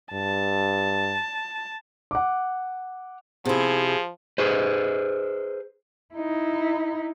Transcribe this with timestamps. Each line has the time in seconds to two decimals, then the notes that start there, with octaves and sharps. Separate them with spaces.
0.13 G2 A5
2.11 F#5 D6
3.45 C3 F3 E4 G#4
4.38 G#4 B4 C5
6.14 D#4 E4